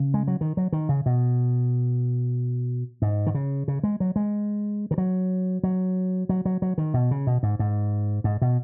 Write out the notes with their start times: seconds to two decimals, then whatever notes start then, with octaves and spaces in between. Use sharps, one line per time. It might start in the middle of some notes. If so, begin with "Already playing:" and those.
Already playing: C#3
0.14 G#3
0.28 F#3
0.41 D#3
0.57 F#3
0.73 D#3
0.89 C#3
1.06 B2
3.02 G#2
3.27 D#3
3.35 C#3
3.68 C#3
3.83 G#3
4.00 F#3
4.16 G#3
4.91 D#3
4.98 F#3
5.63 F#3
6.29 F#3
6.45 F#3
6.62 F#3
6.78 D#3
6.94 B2
7.11 C#3
7.27 B2
7.43 G#2
7.59 G#2
8.24 G#2
8.42 B2